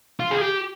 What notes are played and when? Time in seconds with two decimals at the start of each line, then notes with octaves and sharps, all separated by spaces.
0.20 F4
0.31 G#4
0.41 G4